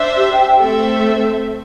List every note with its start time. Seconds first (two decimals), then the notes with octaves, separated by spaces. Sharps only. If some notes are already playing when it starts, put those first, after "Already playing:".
Already playing: D4 C5 E5
0.17 G4
0.33 G5
0.46 G5
0.61 A3 C4 A4 E5